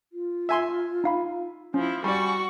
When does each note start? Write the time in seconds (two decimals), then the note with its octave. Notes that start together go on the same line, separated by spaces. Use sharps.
0.13 F4
0.49 E5 G#5 C6
1.04 D#4 F5 B5
1.74 F3 C#4 E4
2.04 G3 F#4 D5 G#5 C#6